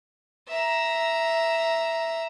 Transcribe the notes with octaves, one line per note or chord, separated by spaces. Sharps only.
E5 A#5